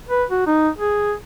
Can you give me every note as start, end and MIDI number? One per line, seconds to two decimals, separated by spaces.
0.09 0.24 71
0.30 0.42 66
0.47 0.69 63
0.78 1.14 68